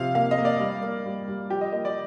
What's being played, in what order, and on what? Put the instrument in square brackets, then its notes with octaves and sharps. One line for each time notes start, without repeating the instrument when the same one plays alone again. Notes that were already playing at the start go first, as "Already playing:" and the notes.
Already playing: [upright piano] C3 F3 F5
A#3 F5
D#5
A#3
D5
G3
A#3
G3
G3
F3 G4
D#5
A#3 D#5
D5